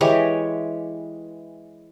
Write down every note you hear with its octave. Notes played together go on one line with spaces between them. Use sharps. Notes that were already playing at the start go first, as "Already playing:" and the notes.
E3 G#3 G4 C#5